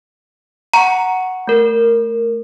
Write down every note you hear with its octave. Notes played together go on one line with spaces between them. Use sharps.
F#5 A#5 C#6 C#7
A3 A#4